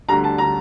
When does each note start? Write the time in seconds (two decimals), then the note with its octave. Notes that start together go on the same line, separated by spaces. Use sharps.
0.09 D2 D3 G3 A#5
0.24 A5
0.38 D3 G3 A#5